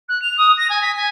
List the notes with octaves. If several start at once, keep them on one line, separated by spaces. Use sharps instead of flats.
F#6
F7
D#6
A#6
G#5
B6
G#5